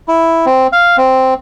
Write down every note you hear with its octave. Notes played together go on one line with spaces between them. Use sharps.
E4
C4
F5
C4